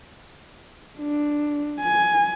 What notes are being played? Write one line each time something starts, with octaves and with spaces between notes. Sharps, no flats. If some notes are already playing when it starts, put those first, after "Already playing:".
D4
G#5